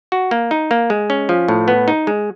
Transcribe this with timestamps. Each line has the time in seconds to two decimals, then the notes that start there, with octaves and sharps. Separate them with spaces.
0.12 F#4
0.31 A#3
0.51 D#4
0.71 A#3
0.90 G#3
1.10 C#4
1.29 F3
1.48 A2
1.68 B3
1.88 D#4
2.07 G#3